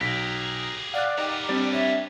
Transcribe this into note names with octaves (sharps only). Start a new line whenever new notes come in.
B1 G4 G#4 A#5 B6
D5 F5 F#5 F#6
B3 D#4 G4 A#4
G3 C4 D4 D5
C#5 E5